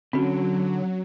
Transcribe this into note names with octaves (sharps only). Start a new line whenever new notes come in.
D3 F#3 C4 C#4 F#4